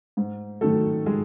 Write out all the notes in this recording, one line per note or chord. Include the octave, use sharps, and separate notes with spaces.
G#2
D#3 F#3 A3 A4
G#3 G#4